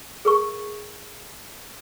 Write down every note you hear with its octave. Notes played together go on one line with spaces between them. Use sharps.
G#4 A#4 C#6